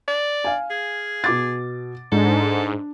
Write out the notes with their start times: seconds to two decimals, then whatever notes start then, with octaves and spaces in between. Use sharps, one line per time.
0.08 D5
0.44 F5 G#5
0.70 G#4
1.24 B2 D6 A6
2.12 G#2 D4 A4